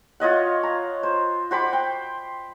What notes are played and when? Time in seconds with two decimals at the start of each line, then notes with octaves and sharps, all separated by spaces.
0.20 F4 C#5 D#5 F#5
0.63 A#5
1.03 C5
1.51 F#4 C5 B5 D6
1.73 G5